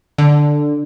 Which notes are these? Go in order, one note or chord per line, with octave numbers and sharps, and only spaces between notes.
D3